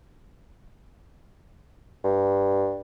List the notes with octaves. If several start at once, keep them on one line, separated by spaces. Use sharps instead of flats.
G2